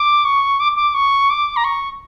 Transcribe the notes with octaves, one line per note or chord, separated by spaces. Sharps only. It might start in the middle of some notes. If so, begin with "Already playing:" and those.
Already playing: D6
C#6
D6
D6
C#6
D6
A#5
C#6